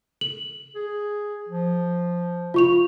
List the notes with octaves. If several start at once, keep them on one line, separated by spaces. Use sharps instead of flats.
F#7
G#4
F3
F4 C#6 F7